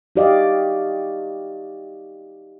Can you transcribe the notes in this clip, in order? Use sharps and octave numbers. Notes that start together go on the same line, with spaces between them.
D#4 F#4 G4 D5 D#5 F5